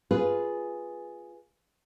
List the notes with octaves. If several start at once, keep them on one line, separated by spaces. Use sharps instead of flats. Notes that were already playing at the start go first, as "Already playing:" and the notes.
F4 G#4 B4